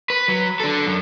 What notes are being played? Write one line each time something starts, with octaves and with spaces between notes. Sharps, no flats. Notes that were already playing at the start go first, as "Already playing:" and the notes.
B4
F#3
D4 A4
F#2